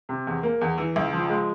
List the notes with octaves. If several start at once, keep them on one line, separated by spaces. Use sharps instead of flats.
C3
E2
A#3
E2
E3
C#2
F3
G#3